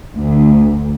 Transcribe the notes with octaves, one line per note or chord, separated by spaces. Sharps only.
D2